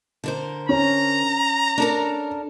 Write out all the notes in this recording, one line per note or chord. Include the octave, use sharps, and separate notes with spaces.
D3 A#4 C5
C#4 C#5 A#5
D4 A4 A#4